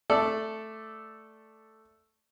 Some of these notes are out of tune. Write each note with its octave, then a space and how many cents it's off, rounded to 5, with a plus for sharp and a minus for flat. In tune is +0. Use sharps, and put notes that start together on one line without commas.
A3 +0 A4 +0 D5 +0